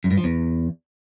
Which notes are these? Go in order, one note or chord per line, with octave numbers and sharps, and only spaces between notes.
F#2
G2
F3
E2